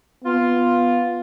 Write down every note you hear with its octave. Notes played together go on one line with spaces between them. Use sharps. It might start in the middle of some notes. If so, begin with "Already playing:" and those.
B3 F4